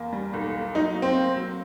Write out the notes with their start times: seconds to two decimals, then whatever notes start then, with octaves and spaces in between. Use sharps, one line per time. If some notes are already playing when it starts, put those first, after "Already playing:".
Already playing: E2 A#3
0.13 G3
0.33 B1
0.53 A#3
0.75 F#3 D#4
0.95 F#3
1.02 C4
1.17 A#3
1.36 F#3